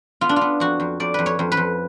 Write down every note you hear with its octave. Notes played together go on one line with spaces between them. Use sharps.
B3 F4
D4
F4
B3
F2 F#4
F2
F2 D5
F2 B4
C#5
F2
B4
F2